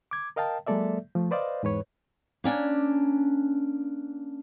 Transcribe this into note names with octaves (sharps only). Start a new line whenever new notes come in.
D6 G#6
A#4 D#5 F5 G5 A5
F#3 G#3 A#3 A4 D5 E5
F3 A3
B4 C5 D5 D#5 F5
E2 G#2 B4 C#5
A#3 C#4 D4